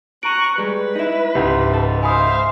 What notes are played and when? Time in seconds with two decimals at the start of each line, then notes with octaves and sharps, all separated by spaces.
0.23 A#5 C#6 F#6 D7 D#7
0.58 G3 G#3 B4
0.96 D#4 E4
1.35 C#2 G#2 G4
1.74 A4
2.03 C5 E5 F5 G#5 B5 D#6